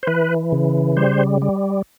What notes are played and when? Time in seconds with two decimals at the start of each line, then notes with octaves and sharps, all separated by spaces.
0.03 C5
0.07 E3 B4
0.52 C#3
0.97 G3 C5
1.42 G3